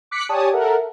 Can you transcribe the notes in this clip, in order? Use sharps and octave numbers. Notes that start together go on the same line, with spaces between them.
D6 F#6 B6 C#7
G4 C#5 D5 G#5 A5 D#6
A4 A#4 E5 F#5